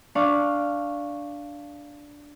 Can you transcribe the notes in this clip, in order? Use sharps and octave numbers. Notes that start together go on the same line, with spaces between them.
D4 F5 C#6